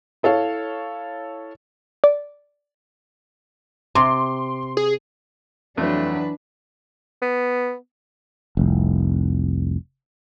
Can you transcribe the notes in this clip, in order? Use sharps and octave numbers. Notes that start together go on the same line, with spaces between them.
E4 A4 C#5 F5
D5
C3 C6 D6
G#4
F2 E3 F#3 A3 D4 B4
B3
F1 C2